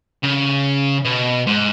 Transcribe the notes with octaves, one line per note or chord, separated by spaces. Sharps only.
C#3
B2
G#2